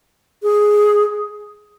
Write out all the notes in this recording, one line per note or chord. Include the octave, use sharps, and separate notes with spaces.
G#4